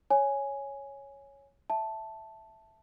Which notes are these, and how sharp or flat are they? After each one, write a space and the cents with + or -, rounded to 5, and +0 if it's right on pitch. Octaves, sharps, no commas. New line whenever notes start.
C#5 +0 G#5 +0
E5 +0 A5 +0